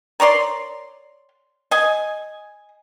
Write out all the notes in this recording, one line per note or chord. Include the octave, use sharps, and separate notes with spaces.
A#4 C#5 D5 C6
D#5 G#5